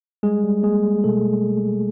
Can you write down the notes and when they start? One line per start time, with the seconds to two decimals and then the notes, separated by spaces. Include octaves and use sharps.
0.23 G3 G#3 G#4
0.44 G3
0.63 G#3 A#3 G#4
0.84 G3
1.04 B2 A3 A4